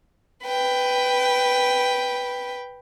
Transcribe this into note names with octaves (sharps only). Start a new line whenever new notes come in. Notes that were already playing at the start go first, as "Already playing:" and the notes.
B4 G5